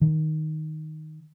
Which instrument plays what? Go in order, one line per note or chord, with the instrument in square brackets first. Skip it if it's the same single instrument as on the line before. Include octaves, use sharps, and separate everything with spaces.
[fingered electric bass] D#3